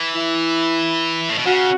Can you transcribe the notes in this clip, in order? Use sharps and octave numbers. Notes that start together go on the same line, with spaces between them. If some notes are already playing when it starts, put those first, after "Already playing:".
Already playing: E3
E4
A2
B2
C#3 F#4